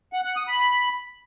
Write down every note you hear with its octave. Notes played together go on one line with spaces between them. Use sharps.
F#5
F#5
D#6
B5